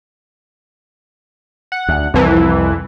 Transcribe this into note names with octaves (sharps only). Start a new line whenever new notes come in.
F#5
D2
C2 F2 E3